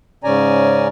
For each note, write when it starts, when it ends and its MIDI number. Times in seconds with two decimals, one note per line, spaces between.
0.24 0.88 44
0.24 0.88 49
0.24 0.88 61
0.24 0.88 74
0.24 0.88 80
0.24 0.88 82